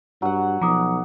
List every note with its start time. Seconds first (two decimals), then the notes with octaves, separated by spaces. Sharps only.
0.22 G2 F#3 F#5
0.61 B1 F3 A#5 D6 D#6